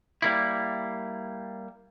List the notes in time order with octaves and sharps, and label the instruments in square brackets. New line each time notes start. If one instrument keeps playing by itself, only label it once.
[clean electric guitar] G3 A#3 E4